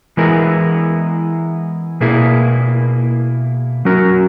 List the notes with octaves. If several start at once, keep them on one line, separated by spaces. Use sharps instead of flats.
E3 G#3 B3 E4 A#4
B2 A#3 E4 G#4
F#3 C#4 F#4 A#4